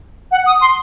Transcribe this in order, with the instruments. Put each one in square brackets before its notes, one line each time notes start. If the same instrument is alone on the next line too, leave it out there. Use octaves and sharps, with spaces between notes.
[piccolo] F#5
D#6
C6